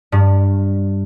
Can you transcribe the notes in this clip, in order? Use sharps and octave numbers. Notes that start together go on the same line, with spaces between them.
G2